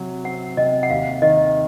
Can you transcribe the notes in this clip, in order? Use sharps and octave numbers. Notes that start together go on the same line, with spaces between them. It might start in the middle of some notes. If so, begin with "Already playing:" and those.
Already playing: C3 F#3
C4 F#5
C3 D#5
F#5
D#2 F5
D#3 D#5